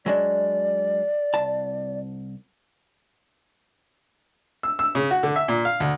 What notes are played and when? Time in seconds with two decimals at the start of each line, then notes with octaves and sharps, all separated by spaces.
0.06 F#3 G#3 D4 D5
1.34 C2 A5
4.63 E6
4.79 E6
4.95 C#3
5.11 F#4
5.23 D3
5.36 E5
5.48 A#2
5.65 F5
5.80 D2